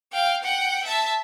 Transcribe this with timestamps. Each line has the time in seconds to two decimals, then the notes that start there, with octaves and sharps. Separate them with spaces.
0.13 F5 G5
0.43 F#5 G5
0.85 E5 A5